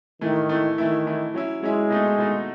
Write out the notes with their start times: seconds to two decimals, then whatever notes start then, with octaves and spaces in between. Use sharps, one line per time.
0.21 A2 D#3 E3 A3
0.49 A2 E3 A3
0.78 D#3 E3 A3 E4
1.06 E3 A3 E4
1.34 F#3 C#4 E4
1.62 F#3 G#3 C#4 E4
1.90 B2 A3 D#4
2.18 B2 A3 D#4